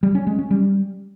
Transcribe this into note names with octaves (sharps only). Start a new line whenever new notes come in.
G3
C#4
G#3
C#4
G3